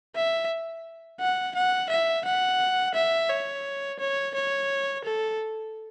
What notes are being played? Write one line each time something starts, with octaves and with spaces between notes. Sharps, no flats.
E5
F#5
F#5
E5
F#5
E5
C#5
C#5
C#5
A4